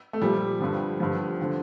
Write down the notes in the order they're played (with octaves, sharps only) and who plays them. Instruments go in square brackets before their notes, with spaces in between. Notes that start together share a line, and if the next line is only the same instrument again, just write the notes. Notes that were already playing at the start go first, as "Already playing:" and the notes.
[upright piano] A3
A#2 F3 G3
G2 D3 F3
G2 D3 F3
D3 F3